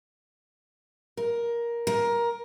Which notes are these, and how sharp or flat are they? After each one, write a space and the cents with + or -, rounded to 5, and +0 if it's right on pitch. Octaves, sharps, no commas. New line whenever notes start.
A#4 +10
A#4 +15